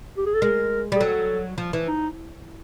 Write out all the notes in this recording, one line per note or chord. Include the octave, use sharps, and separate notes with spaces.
G4
G#4
A4
G#3 A#4
G3
G#4
F#3 A4
F3
E3
D#4